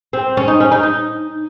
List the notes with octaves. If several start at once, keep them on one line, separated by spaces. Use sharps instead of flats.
C4
C#4
D#4
C#4
D#4
D#4